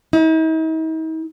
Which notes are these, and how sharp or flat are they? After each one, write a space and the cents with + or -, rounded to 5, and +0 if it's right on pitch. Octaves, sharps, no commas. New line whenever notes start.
D#4 +45